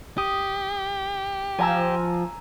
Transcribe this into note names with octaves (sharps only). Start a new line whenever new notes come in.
G4 D#6
F3 G#5 A#5 E6